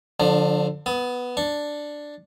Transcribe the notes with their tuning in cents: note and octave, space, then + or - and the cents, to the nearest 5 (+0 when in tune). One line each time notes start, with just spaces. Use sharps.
D3 +0 F3 +35 D4 +35
B3 +0 D#6 +30
D4 +5 C#6 -20